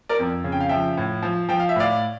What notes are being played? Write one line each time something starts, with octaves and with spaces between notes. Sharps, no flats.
A#4 D5
F2
C#3
G5
F5
F3 E5 G5
A2
F3
F3 G5
F5
E5
A2 D5 F5